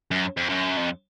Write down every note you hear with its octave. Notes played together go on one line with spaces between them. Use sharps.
F#2
F2
F#2
F2